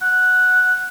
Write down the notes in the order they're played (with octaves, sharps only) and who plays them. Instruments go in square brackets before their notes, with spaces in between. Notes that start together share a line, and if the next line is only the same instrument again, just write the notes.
[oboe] F#5